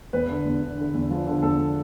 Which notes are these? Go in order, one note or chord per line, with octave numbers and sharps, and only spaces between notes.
E2 B4
D3
E2
D3
D3
E2
F3
D3
E2 A4